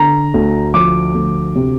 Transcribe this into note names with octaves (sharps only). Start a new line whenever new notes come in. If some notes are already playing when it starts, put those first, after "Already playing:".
Already playing: D3 A#5
D2
F3 D6
D2
C3